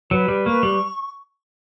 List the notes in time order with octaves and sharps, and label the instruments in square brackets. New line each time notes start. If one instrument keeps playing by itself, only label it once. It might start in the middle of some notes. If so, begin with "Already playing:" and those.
[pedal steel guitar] F#3 [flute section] B4
[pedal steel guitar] G3
[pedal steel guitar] A#3 [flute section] C#6
[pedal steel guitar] G3